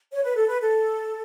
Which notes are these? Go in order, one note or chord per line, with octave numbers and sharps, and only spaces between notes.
C#5
B4
A4
B4
A4